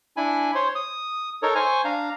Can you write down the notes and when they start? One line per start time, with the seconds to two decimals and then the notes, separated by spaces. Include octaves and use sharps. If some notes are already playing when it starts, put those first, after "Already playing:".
0.17 D4 E4 G#5 B5
0.55 C5 C#5 C6
0.75 D#6
1.43 D#4 A4 A#4 C#5
1.55 C5 G#5 C#6
1.85 D4 F5 A#5